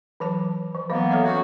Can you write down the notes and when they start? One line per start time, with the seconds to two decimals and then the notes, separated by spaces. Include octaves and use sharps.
0.20 E3 F#3 A5
0.75 F3
0.90 E3 F#3 A#3 B3 D#5
1.11 A4 C#5 E5
1.25 C#4 F#4 C#5